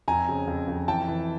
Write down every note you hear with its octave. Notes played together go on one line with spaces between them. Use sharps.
F2 G#5 A#5
C#3
F2
F2
E3 G5 A5
E3